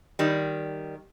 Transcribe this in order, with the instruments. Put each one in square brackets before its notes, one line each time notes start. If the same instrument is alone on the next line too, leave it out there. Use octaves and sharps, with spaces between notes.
[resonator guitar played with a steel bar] D#3 G3